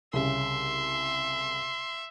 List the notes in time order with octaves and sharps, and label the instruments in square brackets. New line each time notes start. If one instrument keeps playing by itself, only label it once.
[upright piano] C2 C#3 [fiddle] E5 [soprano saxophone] C6